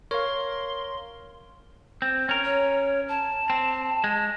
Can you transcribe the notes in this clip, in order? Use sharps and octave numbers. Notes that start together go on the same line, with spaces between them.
A#4 C#5 F5 C6
C4
C#4 A#4
C#5
A5
C4
G#3